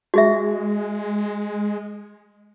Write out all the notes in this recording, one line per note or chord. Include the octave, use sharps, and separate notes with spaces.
G#3 F#4 G#4 E5